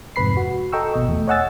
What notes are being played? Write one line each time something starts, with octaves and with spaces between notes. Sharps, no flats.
F2 G#2 C3 B4 B5 C7
F#4
A4 D#5 G5 A#5 C#6 E6
G1 B2 D#5
E2 A3
C#5 D#5 F#5 G#5 E6 A6